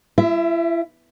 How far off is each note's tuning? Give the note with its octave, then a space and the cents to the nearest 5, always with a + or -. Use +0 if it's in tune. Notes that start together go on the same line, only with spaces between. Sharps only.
E4 +40 E5 +0